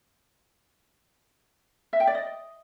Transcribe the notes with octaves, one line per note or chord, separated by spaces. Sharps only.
E5
G5
D5
D#5